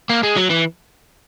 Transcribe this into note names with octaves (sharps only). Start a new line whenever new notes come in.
A#3
G#3
F#3
E3